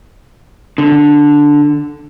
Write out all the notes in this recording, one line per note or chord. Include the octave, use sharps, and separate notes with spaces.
D3